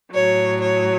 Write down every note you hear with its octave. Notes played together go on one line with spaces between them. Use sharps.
A2 F#3 C#5
C#5